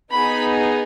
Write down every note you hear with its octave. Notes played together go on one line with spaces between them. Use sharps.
B3 D#4 G#4 B5